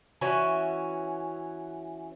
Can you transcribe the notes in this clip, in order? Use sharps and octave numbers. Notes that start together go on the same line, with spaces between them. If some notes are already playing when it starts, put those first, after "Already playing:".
E3 C#4 E4 F#4